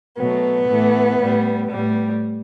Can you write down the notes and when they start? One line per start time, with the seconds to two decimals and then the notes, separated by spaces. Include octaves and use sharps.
0.17 B2 F#3 A3 B3
0.68 A2 E3 A3
1.19 A2 G3
1.69 A2 G3